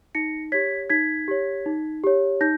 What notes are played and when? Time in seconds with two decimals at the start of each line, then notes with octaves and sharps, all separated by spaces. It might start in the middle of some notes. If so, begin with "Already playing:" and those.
0.15 D#4 A#6 C#7
0.52 G4 C#5 G#6 B6
0.90 D#4 G#6 B6
1.28 G4 C#5
1.66 D#4
2.04 G4 C#5
2.41 D#4 G6 A#6